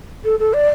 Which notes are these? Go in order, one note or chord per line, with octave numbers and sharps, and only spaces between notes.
A4
A4
D5